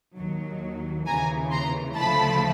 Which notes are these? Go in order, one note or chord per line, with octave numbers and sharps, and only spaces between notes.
D#2 D#3 F#3
D#2 C#3 E3 G#5 A#5
A#5 C6
D2 C#3 F3 A3 A5 B5